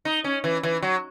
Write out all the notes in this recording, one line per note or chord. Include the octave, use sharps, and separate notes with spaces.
D#4
C#4
E3
E3
F#3